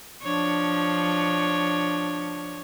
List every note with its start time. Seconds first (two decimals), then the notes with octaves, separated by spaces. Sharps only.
0.23 F3 D4 C#5